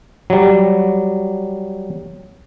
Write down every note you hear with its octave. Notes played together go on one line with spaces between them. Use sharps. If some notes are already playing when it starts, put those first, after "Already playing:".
F#3 G3